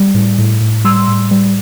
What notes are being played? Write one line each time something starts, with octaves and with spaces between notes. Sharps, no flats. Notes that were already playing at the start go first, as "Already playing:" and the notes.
Already playing: G3
A2
A2
A2
G3 C6 E6
A2
G3